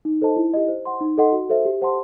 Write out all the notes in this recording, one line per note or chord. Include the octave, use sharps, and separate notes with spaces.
D#4
A4 C5 D#5 A5
E4
G4 D#5
C5
F#5 C6
D#4
A4 D#5 F#5 C6
F#4
A4 C5 E5
G4
C5 F#5 A5 C6